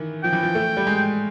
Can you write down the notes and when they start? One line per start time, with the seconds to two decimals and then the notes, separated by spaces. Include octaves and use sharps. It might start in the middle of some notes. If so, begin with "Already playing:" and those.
Already playing: D#3 E3
0.24 F3 G5
0.33 E3
0.43 F3
0.55 A3
0.77 G3
0.87 G#3